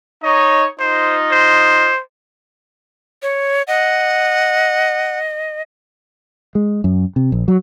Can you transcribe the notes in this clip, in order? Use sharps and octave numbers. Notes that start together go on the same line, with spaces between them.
D#4 C#5 D#5
D#4 F4 C5 D#5
C5
C#5
D#5 F#5
G#3
F#2
C3
A#1
F#3